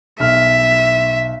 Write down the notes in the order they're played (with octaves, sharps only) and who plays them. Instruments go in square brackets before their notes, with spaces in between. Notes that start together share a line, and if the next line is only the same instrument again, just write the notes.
[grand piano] B1 F6 [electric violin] E5